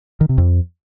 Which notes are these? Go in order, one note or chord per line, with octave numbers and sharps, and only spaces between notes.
D#3
C3
F2